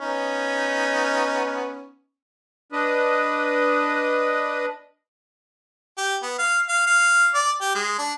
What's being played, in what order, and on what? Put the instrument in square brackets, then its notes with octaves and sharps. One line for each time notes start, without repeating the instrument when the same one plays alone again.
[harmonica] B3 C#4 D#4
[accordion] D4 B4 D#5
[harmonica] G4
B3
F5
F5
F5
D5
G4
G#3
D4